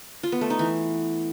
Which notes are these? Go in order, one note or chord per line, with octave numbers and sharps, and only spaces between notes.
F4
B3
A3
D#4
E3